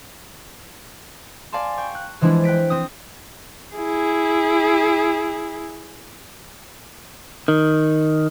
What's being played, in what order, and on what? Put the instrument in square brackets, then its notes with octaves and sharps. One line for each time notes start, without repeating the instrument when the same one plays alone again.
[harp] D5 F5 G#5 A5 C6
G5 C#6
F#6
E3 F3 G#3 D4 E4
G5 F#6 B6 D7
C4 D#6
[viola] E4 G#4
[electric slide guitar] D#3